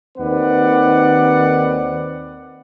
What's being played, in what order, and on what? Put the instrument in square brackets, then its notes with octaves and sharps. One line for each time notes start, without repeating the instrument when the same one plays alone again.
[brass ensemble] D#2 D#3 C4 B4 D5 F#5